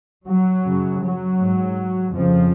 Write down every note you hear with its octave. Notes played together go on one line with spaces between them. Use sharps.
F#3
F#2 C#3
F#3
G#2
F2 C#3 F3